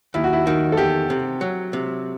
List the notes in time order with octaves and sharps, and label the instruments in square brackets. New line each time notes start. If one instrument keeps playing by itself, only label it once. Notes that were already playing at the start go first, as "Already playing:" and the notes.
[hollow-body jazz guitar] D#2 [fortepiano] E4
[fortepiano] F#4
E4
[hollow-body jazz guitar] D#3 [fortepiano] F#4
[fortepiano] A4
[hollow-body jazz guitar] E2 [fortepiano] G4
[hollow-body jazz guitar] C3
F#3
C3